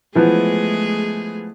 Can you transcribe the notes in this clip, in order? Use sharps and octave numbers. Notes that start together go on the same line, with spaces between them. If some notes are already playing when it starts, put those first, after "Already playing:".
E3 F3 G#3 A3 B3 G#4